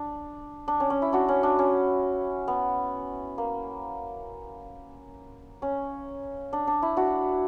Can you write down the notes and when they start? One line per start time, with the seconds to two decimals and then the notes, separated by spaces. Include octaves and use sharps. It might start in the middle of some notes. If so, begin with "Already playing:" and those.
Already playing: D4
0.68 D4
0.80 C#4
0.90 C#4
1.02 E4
1.13 D4 F#4
1.28 C#4
1.43 D4
1.59 C#4
2.48 B3
3.38 A#3
5.62 C#4
6.53 D4
6.67 D4
6.82 E4
6.97 D4 F#4